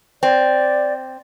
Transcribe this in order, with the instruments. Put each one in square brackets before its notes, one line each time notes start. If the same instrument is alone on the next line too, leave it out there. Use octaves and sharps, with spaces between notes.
[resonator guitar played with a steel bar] C4 [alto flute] D5